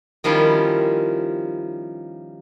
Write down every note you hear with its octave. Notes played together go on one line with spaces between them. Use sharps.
D#3 F3 G3 C#4 E4 F4